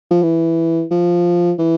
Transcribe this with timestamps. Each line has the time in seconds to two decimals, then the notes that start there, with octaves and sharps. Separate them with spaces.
0.11 F3
0.23 E3
0.91 F3
1.58 E3